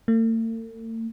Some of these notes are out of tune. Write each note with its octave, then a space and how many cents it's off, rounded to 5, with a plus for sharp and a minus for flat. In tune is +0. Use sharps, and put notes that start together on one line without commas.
A3 +45